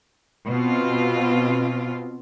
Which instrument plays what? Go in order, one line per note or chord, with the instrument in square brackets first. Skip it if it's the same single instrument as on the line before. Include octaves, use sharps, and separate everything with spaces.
[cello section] B2 C4 F4